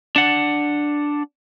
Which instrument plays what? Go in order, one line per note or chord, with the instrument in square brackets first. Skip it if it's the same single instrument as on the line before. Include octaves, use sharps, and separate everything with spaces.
[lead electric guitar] D4 F#5